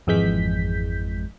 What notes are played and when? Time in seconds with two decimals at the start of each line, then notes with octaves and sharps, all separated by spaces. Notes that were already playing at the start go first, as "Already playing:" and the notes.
0.07 G#1 F2 E3 G#3 G6 B6